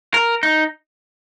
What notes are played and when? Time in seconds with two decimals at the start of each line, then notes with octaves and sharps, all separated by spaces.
0.14 A#4
0.43 D#4